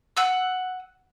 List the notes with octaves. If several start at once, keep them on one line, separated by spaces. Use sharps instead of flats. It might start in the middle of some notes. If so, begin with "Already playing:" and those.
F#5 E6